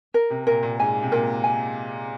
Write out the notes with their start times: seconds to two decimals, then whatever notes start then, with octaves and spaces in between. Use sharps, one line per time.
0.14 A#4
0.30 C3
0.47 A#2 A#4
0.63 A#2
0.79 G#2 G#5
1.03 C3
1.12 A#2 A#4
1.44 G#5